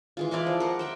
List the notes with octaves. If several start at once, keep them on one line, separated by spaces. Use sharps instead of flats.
E3 G#3 F4
E4 D5 D#5 F5
F3
A#4 F#5
C5 E5 G5